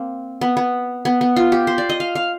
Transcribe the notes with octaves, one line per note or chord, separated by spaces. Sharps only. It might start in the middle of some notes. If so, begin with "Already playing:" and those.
Already playing: A#3 C4
B3
B3
B3
B3
F4
G4
C5
D5
D#5
F5
F5